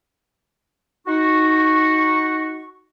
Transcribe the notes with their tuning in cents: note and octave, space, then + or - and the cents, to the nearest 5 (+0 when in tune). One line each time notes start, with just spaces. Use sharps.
D#4 +15 F#4 +5 C#6 -10